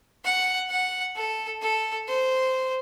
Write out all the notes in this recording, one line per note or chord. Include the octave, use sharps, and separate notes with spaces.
F#5
F#5
A4
A4
C5